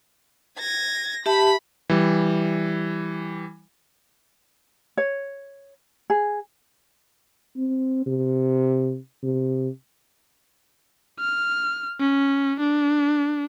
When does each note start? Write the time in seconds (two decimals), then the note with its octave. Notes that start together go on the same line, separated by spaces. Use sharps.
0.59 G#6 A#6
1.26 G4 E5 A5 B5
1.90 E3 G3
4.97 C#5
6.10 G#4
7.56 C4
8.06 C3
9.23 C3
11.20 F6
12.00 C#4
12.60 D4